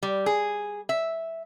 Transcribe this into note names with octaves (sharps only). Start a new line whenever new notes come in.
G3
G#4
E5